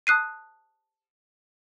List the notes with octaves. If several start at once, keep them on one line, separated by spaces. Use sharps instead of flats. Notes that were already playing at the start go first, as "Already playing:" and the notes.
A5 D#6 F#6 C7 D#7